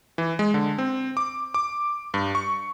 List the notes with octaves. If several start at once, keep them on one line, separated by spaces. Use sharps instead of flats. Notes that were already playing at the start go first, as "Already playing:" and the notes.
E3
G#3
D3
C4
D6
D6
G2
C#6